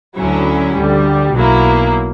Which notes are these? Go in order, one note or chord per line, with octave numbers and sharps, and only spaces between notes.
D2 D3 F#3 C#4 E4
D2 D3 G3
B1 B2 F#3 A#3 E4